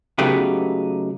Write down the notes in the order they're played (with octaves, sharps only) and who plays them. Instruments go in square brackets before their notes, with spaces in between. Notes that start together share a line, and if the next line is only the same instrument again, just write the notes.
[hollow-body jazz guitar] C#3 F#3 A3 B3 D#4 G4